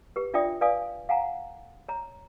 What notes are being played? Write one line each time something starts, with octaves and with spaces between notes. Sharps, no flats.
G4 B4
D4 F4 D5 E5 G5 D#6
B4 D5 F5 G#5 D#6
F5 F#5 G#5 A#5
C#5 A#5